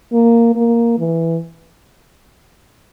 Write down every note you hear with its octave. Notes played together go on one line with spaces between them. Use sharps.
A#3
A#3
E3